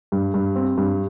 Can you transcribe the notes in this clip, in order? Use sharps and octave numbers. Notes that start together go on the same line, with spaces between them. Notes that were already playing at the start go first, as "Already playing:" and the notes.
G2
G2
C4
G2